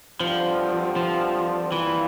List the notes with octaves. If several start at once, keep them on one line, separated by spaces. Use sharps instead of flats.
G2 D3 F3 G3 C4 F4
F3
A#2 E3 G3 C4 F4